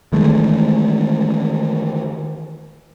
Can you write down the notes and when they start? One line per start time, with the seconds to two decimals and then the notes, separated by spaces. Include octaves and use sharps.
0.13 D#3 E3 G#3 A3